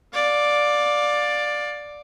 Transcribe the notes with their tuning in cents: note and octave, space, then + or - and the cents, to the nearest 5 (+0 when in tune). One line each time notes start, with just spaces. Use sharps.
D5 +5 F5 +30